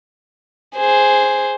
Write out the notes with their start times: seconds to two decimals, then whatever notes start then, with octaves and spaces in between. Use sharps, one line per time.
0.76 G#4 C5